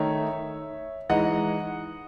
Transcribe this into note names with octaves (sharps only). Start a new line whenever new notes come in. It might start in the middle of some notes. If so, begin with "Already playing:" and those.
Already playing: D#3 A3 D#4 C#5 E5
E3 G#3 D#4 D#5 F#5